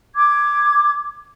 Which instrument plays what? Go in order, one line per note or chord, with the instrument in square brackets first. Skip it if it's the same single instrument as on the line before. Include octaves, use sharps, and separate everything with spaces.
[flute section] D6 G#6